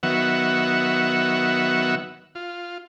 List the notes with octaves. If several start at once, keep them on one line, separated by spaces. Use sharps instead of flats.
D#3 F#3 B3 E5 F#5 C#6
F4